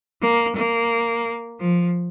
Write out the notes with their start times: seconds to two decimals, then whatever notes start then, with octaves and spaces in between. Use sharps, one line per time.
0.22 A#3
0.56 A#3
1.60 F3